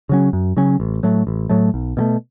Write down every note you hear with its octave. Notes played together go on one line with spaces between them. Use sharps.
C#3 F#3 C#4
F#2
C#3 F#3 C#4
A1
A2 F#3 A3
A1
A2 F#3 A3
B1
B2 F#3 A3